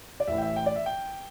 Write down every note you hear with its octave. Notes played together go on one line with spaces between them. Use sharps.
D5
A1 A2 E3 E5
G5
E5
G5
D5
E5
G5